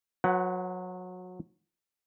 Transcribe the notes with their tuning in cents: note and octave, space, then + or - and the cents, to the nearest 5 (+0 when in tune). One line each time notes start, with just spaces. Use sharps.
F#3 -25 B4 +0 F#5 +15